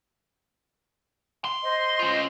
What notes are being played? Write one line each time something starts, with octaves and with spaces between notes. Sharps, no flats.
C6
C5 D#5
C#4 F4